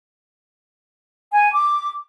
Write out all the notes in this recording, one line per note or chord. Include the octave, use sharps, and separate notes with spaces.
G#5
D6